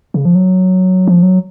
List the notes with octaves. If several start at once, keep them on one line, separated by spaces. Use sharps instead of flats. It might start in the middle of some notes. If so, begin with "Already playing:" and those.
C#3
F3
F#3
F3
F#3